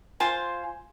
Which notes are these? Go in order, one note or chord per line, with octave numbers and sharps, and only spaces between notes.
F4 C5 G#5